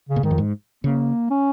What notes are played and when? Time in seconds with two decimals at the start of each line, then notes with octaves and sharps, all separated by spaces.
0.09 C#3
0.16 A#2
0.23 G#2 D#3
0.31 F2
0.38 G#2
0.84 C#3 A#3
1.30 C#4